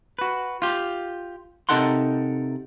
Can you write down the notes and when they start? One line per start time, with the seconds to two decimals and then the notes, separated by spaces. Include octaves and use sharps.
0.19 F#4 B4
0.62 F4 G4
1.69 C3 D#4 A4 A#4 F#5 C6